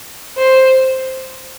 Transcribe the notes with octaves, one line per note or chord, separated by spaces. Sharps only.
C5